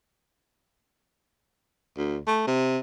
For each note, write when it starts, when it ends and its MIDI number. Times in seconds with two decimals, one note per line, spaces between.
1.98 2.19 38
2.27 2.43 57
2.47 2.79 48